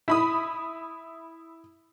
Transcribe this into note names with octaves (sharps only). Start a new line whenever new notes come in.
E4 B5 D#6